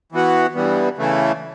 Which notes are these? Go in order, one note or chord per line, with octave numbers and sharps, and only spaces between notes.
E3 B3 F#4
G2 E3 G3 B3
C#3 E3 A3